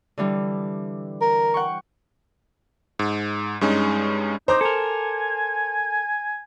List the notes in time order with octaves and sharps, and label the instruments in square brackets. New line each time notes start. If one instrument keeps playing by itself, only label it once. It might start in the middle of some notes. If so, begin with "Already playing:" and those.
[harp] D3 E3 G3
[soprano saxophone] A#4
[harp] F#5 G5 C#6
[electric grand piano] G#2
G2 G#3 C#4 D#4
[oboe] D#4 [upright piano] C5 A#5 D6
[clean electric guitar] A4 A#4 [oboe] G#5